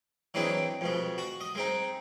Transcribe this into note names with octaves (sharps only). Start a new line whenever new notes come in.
E3 F#3 G#3 C4 D4 D#4
F2 B2 G#3
F#4 F#5
D#5
G#3 C4 D#4